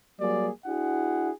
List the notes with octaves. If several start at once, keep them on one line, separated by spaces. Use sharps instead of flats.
F#3 G3 A#3 G#4 D5
D4 E4 F#4 G#4 F#5